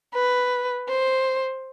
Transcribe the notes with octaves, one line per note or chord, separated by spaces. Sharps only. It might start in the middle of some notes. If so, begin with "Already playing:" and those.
B4
C5